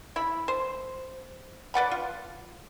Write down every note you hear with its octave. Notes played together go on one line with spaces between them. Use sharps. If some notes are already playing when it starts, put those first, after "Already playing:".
E4 B5
C5
B4 D5 F#5 B5
F4